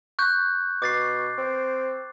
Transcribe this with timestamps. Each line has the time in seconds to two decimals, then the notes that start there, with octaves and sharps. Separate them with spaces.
0.19 C#6 F#6 G6
0.82 B2 D6 A6 C7
1.38 C4